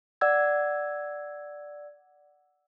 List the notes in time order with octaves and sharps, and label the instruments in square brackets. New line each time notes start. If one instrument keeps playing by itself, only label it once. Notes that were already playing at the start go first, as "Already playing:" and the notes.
[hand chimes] D5 F#5 E6 G#6